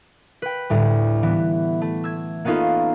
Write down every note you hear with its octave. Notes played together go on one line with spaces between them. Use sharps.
B4 G5
D2 A2 G3
E3 B3
A3
E6 G#6
A#3 B3 C#4 D#4 F4 A4